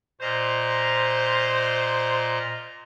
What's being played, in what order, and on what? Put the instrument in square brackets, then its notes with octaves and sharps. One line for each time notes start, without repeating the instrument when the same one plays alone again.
[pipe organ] A#2 D#5 A#5 [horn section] C5